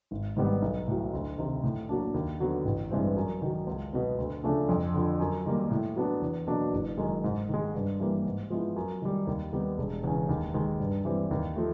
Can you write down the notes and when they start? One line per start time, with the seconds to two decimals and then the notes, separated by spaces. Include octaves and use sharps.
0.11 G#1
0.37 G#2 D#3 G3 B3
0.62 B1
0.88 A2 F#3
1.13 D2
1.38 C3 D#3
1.63 A2
1.89 F#3 A#3 D4
2.14 D#2
2.40 D3 F#3 B3
2.65 A1
2.91 G2 E3 G#3 C4
3.17 F#2
3.42 D#3 F#3
3.67 C#2
3.93 B2 F#3 B3
4.18 D2
4.43 C#3 F3 A3 D4
4.69 F2
4.94 D3 F3
5.20 F#2
5.46 D#3 G3 A#3
5.71 A2
5.96 F#3 B3 D4
6.22 E2
6.47 B2 F#3 A#3 D4
6.73 F#1
6.98 F#2 D#3 G#3
7.24 G#2
7.49 D#3 G#3
7.75 G2
8.00 E3 G3 A#3
8.25 G#2
8.50 F3 G#3 B3 E4
8.76 F#2
9.02 D#3 G3
9.27 D#2
9.53 D#3 G3 B3
9.78 E1
10.03 E2 C#3
10.29 D#2
10.54 D#3 G#3
10.80 G2
11.05 E3 G3 C4
11.31 D#2
11.56 F3 A3